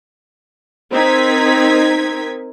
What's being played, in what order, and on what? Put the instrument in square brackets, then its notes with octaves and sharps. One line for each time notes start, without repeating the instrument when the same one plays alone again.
[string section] C4 D#4 A#4 G#6 B6